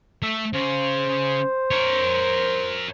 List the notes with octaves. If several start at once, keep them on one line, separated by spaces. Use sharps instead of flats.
A3 E5
C#3 C5
A#4 C#5